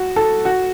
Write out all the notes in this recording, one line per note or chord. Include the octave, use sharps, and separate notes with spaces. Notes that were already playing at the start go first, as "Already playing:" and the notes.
Already playing: F#4
A4
F#4